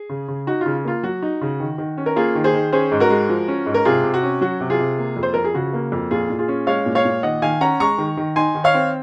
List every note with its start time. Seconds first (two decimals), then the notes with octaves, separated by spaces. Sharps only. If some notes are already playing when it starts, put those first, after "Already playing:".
Already playing: G#4
0.09 C#3
0.28 C#3
0.47 D#4 F#4
0.61 C#3 F4
0.85 A#3 F4
1.03 F#3 F#4
1.22 D#4
1.41 C#3
1.60 D#3
1.78 D#3
1.98 C#4
2.06 A#4
2.16 A#3 F4 G#4
2.35 D#3
2.44 G#4 C5
2.54 D#3
2.72 C#4 G#4 C5
2.91 G#2
3.00 F#4 A#4
3.10 G#3
3.29 F3
3.48 C#4
3.66 G#2
3.74 A#4
3.85 C3 F4 G#4
4.04 C3
4.14 F#4
4.23 C#4
4.41 F#3 F#4
4.61 C3
4.70 F4 G#4
4.80 C3
4.98 A#3
5.17 F2
5.23 C5
5.34 F3 A#4
5.45 G#4
5.54 C#3 F#4
5.73 A#3
5.92 F2
6.11 A#2 F4 G#4
6.30 A#2
6.39 F4 G#4
6.48 C#4
6.67 G#3 C#5 F5
6.86 A#2
6.95 C#5 F5
7.05 A#2
7.23 D#3 D#5 F#5
7.42 D#3 F5 G#5
7.61 C#4 F#5 A#5
7.80 G#3 A#5 C#6
7.98 D#3
8.17 D#3
8.36 D#4 G#5 C6
8.55 D#3
8.64 C#5 F5
8.74 C4